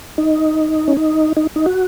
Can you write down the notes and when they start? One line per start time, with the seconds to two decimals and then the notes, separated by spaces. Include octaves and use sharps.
0.18 D#4
0.88 C#4
0.97 D#4
1.37 D#4
1.56 D#4
1.66 F#4